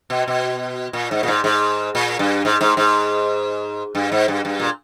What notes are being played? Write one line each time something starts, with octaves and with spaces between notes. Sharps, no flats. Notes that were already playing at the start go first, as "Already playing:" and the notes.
B2
B2
A#2
G#2
A#2
G#2
G#2
A#2
G2
G#2
G#2
G#2
G2
G#2
G2
G2
A#2